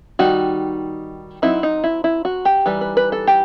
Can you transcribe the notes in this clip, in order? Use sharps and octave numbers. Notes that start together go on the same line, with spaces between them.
D#3 G3 D#4 F#4
F#3 C4 D#4 E4
D#4
E4
E4
F#4
G4
E3 G3 D#4 B4
B4
B4
A4
G4